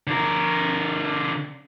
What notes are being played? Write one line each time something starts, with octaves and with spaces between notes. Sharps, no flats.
D3 A#4